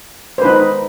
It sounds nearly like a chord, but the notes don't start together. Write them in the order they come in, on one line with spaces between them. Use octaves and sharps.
C5 B4 D#4